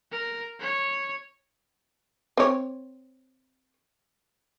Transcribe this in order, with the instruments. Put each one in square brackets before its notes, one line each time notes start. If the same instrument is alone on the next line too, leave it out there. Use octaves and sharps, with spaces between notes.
[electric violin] A#4
C#5
[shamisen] C4 C#5